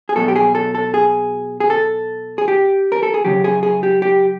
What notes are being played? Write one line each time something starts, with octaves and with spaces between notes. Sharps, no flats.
G#4
B2 F#3 A4
G4
G#4
A4
A4
G#4
G#4
A4
G#4
G4
A#4
A4
G#4
C#3 F#3 G4
G#4
G#4
G4
G4